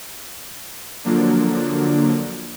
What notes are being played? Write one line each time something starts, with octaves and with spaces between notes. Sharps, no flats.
D3 F3 F#3 A#3 D4